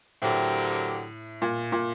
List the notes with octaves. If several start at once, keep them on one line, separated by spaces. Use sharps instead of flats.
A2 D3 F#3 C4 G4 A#4
A#2
A#2